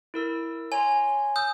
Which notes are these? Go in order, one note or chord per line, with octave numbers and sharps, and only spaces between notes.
E4 A#4 E6
C#5 G#5 A#5 C6
D#6 E6 G6